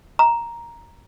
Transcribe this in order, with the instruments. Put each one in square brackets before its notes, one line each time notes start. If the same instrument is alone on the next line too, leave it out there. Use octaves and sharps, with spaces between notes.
[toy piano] A#5